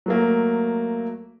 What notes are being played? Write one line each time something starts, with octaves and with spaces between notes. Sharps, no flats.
F#3 A3 A#3